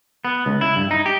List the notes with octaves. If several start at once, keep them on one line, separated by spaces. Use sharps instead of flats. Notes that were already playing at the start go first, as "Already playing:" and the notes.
B3
C#2
E4
G2
D#4
G4